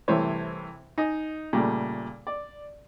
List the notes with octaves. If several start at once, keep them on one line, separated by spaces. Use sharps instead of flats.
C2 C3 E3 A3 C5 C#5
D#4 D#5 G#5
A#2 C#3 G3 A3
D5